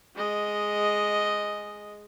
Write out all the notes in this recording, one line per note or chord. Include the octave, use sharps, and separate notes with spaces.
G#3 D#5